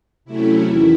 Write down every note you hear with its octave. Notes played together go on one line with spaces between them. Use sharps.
C3 F#3 A3 C#4 E4
E2 D#3